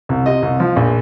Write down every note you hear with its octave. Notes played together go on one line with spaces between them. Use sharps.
C2
C3 D#5
C2
F3
A#1